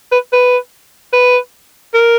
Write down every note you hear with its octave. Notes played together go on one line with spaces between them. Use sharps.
B4
B4
B4
A#4